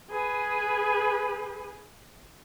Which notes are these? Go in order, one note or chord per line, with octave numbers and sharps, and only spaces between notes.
G#4 B4